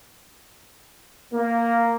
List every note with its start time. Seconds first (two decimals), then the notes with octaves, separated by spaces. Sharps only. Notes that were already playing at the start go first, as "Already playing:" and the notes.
1.33 A#3